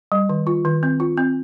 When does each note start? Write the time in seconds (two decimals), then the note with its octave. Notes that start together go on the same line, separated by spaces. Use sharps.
0.12 G3
0.29 D#3
0.47 F4
0.65 D#3
0.83 C4
1.00 F4
1.17 C4